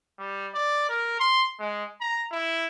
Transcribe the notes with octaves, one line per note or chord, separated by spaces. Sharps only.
G3
D5
A#4
C6
G#3
A#5
E4